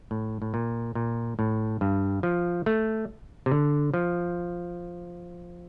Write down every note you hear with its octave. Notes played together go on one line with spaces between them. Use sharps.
A2
A2
A#2
A#2
A2
G2
F3
A3
C3
D3
F3